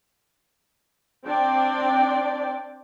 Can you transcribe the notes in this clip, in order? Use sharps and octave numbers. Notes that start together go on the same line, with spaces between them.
C4 D4 D5 G5